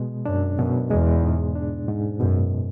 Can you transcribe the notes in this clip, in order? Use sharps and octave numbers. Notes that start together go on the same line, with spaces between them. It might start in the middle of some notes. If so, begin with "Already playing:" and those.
Already playing: B2 G#3
F#2 D4
F#2 B2
E2 G#3
G#2
D4
G#2
F#2 B2